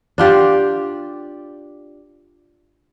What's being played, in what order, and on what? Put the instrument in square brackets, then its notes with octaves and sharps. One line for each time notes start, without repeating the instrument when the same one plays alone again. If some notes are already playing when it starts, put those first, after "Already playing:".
[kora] D4 F4 G4